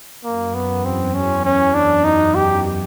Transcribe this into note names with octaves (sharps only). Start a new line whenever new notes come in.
F#2 A#3
B3
E2
C4
C#4
C#4
D4
D#4
G4